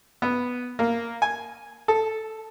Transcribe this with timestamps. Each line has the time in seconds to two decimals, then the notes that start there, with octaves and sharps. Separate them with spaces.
0.22 B3
0.79 A#3
1.22 G#5
1.88 A4